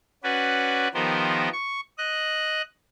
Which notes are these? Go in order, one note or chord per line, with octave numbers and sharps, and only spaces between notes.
C#4 F#4 B4 D5
D#3 F3 B3 G4 A#4 C5
C#6
D#5 F#6